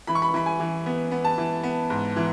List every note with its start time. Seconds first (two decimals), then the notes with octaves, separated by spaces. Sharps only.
0.07 E3 B5
0.15 C#6
0.22 B5
0.28 C#6
0.34 E3 B5
0.46 G#5
0.60 E3
0.86 B3
1.11 B3
1.24 A5
1.38 E3
1.63 B3
1.90 G#2
2.16 E3